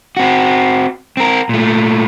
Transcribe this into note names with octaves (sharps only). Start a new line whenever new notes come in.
C4 F#4
C4 A#4
A#2 A3